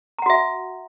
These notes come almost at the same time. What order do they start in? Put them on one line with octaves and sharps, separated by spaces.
A#5 F#5 F#4 E5